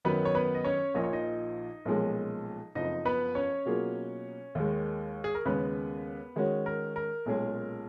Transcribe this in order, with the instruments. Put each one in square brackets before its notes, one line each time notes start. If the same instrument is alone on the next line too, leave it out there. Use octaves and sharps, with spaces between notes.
[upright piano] F#2 D#3 F#3 [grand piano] B3 B4
[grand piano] C#5
B3 B4
D#5
C#4 C#5
[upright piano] A#1 A#2 F3 [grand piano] D#5
[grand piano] C#5
D#4 D#5
[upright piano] B1 A#2 F3 G#3 C#4
[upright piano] F#1 F2 F3 [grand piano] D#4 D#5
[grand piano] B3 B4
C#4 C#5
[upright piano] B2 F#3 A#3 F4 G#4
D#2 D#3 G#3
[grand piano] G#4
A#4
[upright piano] D#2 C#3 G#3 [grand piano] B3 B4
[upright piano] D#3 G#3 C#4 F#4
[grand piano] A#4
A#4
[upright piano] B1 A#2 G#3 C#4 G#4